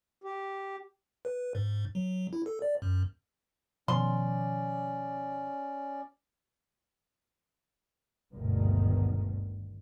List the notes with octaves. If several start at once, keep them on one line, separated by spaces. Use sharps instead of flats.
G4
B4
G#2
F#3
E4
A4
D5
F#2
B2 D#3 F3 C#4 D5 C6
G#1 D2 G2 B2 D#3